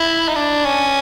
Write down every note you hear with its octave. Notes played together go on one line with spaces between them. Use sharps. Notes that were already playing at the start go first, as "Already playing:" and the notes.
Already playing: E4
D#4
D4
C#4